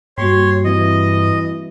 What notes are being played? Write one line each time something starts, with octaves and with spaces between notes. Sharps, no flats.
G2 G3 A#3 F#4 C#5 C6
E3 C4 D#5